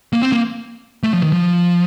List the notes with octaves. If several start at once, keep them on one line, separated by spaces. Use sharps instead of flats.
A#3
C4
A#3
A3
F3
D#3
F3